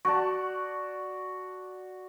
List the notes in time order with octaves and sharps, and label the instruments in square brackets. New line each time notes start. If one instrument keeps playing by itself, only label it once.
[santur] F#4 D5 A5 [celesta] C#6